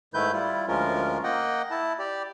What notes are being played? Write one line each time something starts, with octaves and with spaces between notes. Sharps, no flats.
G#2 D#3 A3 E4 B4 G6
G3 E4 F4
D2 F3 G#3 C#4 F4 A#4
A#3 D#5 F#5 G5
E4 A5
G4 D5